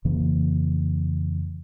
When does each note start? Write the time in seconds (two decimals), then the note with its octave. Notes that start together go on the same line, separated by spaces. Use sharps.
0.05 F2 C#3 E3 A#3